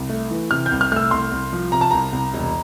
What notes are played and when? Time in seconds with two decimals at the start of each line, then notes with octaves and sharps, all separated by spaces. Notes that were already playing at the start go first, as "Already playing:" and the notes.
Already playing: C2
0.09 A3
0.31 E3
0.51 C3 F6
0.66 G6
0.72 C2
0.81 F6
0.92 A3 F6
0.96 E6
1.11 C2 C6
1.32 C2
1.53 F3
1.72 C3 A#5
1.81 A5
1.91 C2 A#5
2.13 C2
2.34 E1